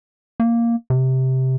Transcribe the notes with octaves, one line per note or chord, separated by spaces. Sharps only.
A#3
C3